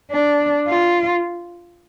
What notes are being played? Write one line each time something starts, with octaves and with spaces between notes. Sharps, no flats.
D4
F4